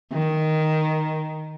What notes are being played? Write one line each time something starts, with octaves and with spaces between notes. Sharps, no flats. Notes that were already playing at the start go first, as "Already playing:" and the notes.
D#3